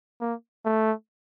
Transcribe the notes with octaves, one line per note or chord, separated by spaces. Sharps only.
A#3
A3